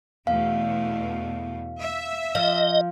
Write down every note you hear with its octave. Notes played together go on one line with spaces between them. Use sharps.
E2 B2 A3 F5
E5
F3 D#5